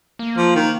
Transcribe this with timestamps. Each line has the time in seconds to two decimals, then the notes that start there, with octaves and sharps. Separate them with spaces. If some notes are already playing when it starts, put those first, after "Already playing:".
0.19 A#3
0.37 F3
0.55 D#3